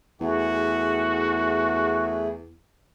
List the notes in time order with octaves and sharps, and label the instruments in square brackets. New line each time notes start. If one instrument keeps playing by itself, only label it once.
[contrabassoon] E2 [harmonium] A3 E4 G#4 [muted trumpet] F#4